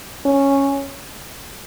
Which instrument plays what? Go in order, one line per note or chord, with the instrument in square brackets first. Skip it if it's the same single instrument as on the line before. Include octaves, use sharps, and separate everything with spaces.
[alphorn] C#4